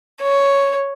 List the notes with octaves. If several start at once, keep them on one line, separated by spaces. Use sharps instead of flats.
C#5